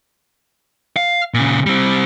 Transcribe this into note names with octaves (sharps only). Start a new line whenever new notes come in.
F5
A#2 C#3
G3 C4